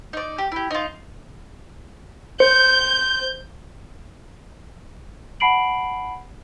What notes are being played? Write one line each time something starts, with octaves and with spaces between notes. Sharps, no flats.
D#4 D5
G4
E4 G4
D#4 F4
C5 G6
F#5 A5 B5 C7 D7 F#7